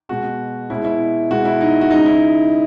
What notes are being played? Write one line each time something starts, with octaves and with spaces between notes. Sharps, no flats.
B2 G#3 F#4
B2 G#3 E4
E4
B2 G#3 F#4
E4
D#4
F#4
C#3 G#3 D#4
E4